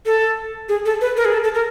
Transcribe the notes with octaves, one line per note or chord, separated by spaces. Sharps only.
A4
G#4
A4
B4
A#4
G#4
A4
A4
A#4